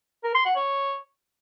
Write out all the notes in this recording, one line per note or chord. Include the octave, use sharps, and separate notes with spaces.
A#4
C6
F#5
C#5